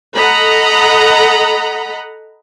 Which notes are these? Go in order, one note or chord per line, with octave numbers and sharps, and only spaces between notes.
A4 D#5 F#5 A#5 B5